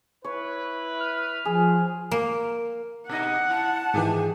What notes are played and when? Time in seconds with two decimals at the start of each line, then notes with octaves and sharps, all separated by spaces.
0.24 E4 B4 C#5
1.00 F6
1.45 F3 G#4
2.11 A#3
3.09 B2 D#4 D#5 F#5
3.50 E4 A5
3.94 G#2 D#3 E3 F4 G4 G#4